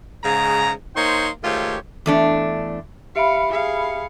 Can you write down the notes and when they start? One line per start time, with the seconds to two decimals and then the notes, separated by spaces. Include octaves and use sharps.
0.23 G#2 C#3 A#5
0.96 A#3 D#4 C5 C#5 G5 C6
1.43 G#2 D#3 A3 F4 G4 C#5
2.06 E2 A3 D4
3.16 G4 E5 F5 B5 C#7 D7
3.50 G#4 F5